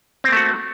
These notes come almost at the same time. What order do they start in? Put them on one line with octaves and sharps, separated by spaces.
C4 A#3 A3 F#4